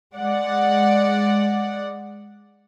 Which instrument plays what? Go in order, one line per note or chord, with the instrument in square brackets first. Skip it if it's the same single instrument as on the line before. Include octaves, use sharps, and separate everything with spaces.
[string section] G#3 D5 F#5